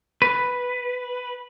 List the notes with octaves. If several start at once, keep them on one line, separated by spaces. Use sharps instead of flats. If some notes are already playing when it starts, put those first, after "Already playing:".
B4